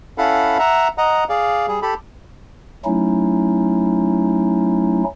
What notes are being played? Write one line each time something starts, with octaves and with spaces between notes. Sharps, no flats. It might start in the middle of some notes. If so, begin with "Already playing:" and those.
C#4 E4 A4 F5 F#5 B5
E5 F#5 A#5
D#5 F#5 A#5
G#4 D5 F5
G3 G#4
G4 A4 B5
F#3 A3 C#4 D#4 E4